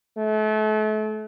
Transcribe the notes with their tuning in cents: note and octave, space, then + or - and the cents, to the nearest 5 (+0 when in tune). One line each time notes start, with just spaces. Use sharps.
A3 -35